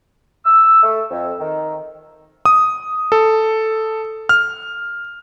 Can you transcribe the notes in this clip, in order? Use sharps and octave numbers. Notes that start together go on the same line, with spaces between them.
E6
A3
F2
D#3
D#6
A4
F6